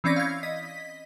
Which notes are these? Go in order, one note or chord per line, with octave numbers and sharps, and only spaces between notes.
E3 C4 C#4 D5 A#6 B6
F5 G#6
D#5 B6